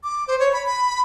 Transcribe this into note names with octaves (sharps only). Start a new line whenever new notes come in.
D6
C5
C#5
B5
B5